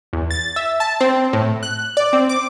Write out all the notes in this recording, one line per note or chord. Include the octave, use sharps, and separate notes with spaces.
E2
A6
E5
A5
C4
A2
F#6
D5
C4
D6